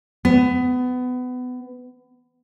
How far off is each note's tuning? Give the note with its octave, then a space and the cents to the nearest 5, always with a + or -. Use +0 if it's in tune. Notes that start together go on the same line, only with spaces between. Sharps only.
B3 +25